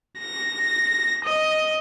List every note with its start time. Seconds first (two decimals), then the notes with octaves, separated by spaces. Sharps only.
0.19 A#6
1.24 D#5